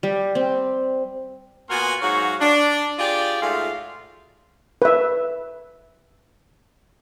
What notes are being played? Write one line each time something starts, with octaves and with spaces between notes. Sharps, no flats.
G3
C4
A#2 B3 F#4 A#4 G#5 C6
G#2 F#3 F#4 C#5 F5 A#5
D4
F4 G4 G#4 D5
G#2 G#3 A3 F4 F#4
B4 E5